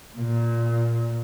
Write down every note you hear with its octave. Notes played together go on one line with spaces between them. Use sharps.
A#2